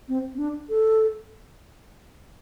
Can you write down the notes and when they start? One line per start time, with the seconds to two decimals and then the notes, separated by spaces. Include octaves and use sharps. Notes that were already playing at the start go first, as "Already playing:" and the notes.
0.08 C4
0.34 C4
0.38 D4
0.69 A4